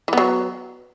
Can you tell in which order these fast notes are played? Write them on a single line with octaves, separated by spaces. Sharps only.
E3 B3 F#3